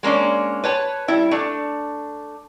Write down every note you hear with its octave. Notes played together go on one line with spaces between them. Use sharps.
G#3 A#3 C#4 D4
B4 C#5 A5
G3 E4
A3 D4